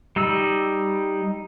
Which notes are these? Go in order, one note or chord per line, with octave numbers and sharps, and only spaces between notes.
G3 D#4 E6